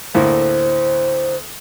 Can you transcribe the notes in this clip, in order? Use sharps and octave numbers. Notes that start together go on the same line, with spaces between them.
D2 A2 A#3 C5